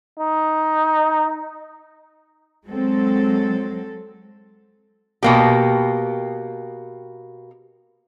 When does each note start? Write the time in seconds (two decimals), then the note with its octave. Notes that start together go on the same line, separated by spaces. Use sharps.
0.19 D#4
2.67 F#3 G#3 C4 A4
5.23 B2 A#3 G4